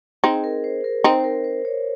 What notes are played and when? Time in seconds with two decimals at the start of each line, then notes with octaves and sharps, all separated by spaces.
0.24 C4 D#4 G#4
0.44 A#4
0.64 C5
0.84 A#4
1.04 C4 D#4 C5
1.20 C5
1.24 A#4
1.44 C5
1.65 C#5